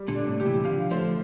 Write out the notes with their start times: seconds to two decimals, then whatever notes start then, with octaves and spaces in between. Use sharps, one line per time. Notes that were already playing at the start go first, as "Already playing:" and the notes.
Already playing: G3
0.08 A#2 D3
0.15 D4
0.27 A2 C3
0.40 G4
0.46 C3 E3
0.65 D3 F3 F5
0.90 F3 A3 C5